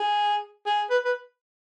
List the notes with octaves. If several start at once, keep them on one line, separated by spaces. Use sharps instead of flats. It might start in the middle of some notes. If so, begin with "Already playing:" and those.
Already playing: G#4
G#4
B4
B4